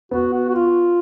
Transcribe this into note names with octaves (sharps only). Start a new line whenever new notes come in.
B3 F#4
F#4
F#4
F4